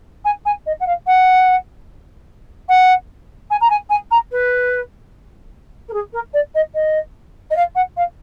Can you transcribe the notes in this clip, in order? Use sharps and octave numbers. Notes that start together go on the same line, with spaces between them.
G#5
G#5
D#5
F#5
F5
F#5
F#5
G#5
A#5
G#5
G#5
A#5
B4
A#4
G#4
A#4
D5
D#5
D#5
D#5
F5
F#5
F5